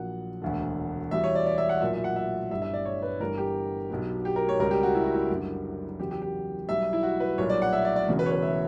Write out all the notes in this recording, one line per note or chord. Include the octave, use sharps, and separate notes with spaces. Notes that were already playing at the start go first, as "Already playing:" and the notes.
Already playing: A#1 A#2 F#3 F#5
E1 D2 D3
E2 B2 G3 E5
C#5
D5
D5
E5
F#5
B1 A#2 F#3 E5
E5
F#5
E5
G1 G2 E3 G3 E5
E5
D5
C#5
B4
G1 G2 E3 A#4
G4
B1 B2 F#3
G4
A#4
C#5
C#2 B2 G3 A#4
G4
F#4
E4
F#4
E4
F#1 F#2 D3 G3
E2 C#3 F#3 G4
G4
G4
B1 B2 G3 E5
E4
F#4
B4
B1 A#2 G3 C#5
D5
F#5
E5
D5
D5
E1 E2 C#3 F#3
B4
C#5
B4
E5